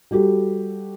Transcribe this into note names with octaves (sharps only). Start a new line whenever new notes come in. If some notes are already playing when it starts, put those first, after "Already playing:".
G3 F#4 G4 A4